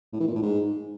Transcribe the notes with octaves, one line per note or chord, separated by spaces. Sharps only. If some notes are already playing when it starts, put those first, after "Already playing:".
A2
E3
A#2
A2
G#2